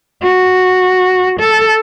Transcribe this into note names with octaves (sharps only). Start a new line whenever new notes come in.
F#4
A4